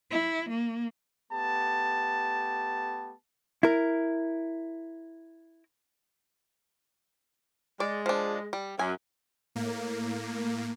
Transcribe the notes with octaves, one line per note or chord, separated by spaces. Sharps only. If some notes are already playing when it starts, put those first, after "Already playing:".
E4
A#3
A3 B3 G4 A5
E4 A#4
G#3 D5
F3 D4
G3
F#2 G#5
A2 A#3